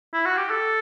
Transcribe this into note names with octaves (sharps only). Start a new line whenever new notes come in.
E4
F#4
G4
A4